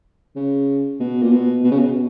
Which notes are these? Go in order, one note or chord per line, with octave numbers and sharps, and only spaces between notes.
C#3
B2
A#2
B2
B2
C#3
B2